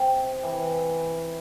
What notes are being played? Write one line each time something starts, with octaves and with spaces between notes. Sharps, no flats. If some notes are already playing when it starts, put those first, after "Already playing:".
Already playing: C3
E3